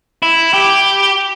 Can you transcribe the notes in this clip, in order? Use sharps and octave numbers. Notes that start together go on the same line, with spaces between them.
E4
G4